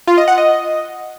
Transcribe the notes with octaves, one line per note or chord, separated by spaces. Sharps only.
F4
D#5
F#5
D#5